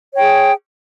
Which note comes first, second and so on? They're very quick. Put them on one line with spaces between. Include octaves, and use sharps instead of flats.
C#5 G5 G#4